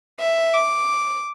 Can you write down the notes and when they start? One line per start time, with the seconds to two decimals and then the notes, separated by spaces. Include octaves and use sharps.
0.20 E5
0.54 D6